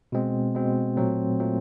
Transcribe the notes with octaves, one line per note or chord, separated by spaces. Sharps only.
B2 G#3 C4
B2 G#3 C4
A#2 F#3 A3 C4
A#2 F#3 A3 C4